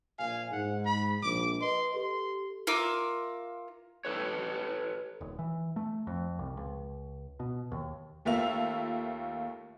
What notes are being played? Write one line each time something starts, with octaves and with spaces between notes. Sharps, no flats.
A#1 F5 G#5
G#2 F#5
B5
A#1 D6
B4 D#5 C6
G4 A4 C6
F4 A#4 E5 D6
A4 B4 C#5
D#1
E3
A3
F2
C2
C#2
B2
D#2
D#2 A3 A#3 F4 E5 F7